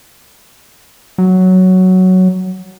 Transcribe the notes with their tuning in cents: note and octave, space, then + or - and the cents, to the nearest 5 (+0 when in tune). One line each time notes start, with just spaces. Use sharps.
F#3 +5